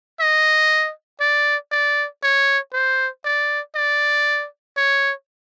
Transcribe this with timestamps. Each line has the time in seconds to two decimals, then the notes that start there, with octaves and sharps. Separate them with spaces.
0.20 D#5
1.21 D5
1.72 D5
2.23 C#5
2.73 C5
3.25 D5
3.76 D5
4.77 C#5